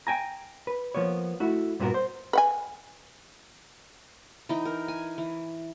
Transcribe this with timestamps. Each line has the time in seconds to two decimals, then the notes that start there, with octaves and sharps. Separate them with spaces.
0.07 G5 G#5 A#5
0.67 B4
0.95 F3 A#3 B3 C#5
1.40 A3 E4 F#4
1.80 G2 A#2 B3 D#4 F#4 A#4
1.94 C5
2.33 B4 F#5 G#5
4.49 E3 D#4 G5
4.65 A#4
4.88 G#5
5.18 E3